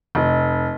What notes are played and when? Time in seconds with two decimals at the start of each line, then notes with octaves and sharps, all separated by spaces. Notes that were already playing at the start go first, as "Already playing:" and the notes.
0.15 F1